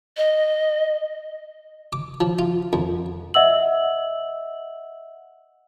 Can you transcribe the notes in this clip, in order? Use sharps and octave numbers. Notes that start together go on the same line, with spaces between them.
D#5
D6
F3
F4
F2
D#5 E5 F#5 E6 F#7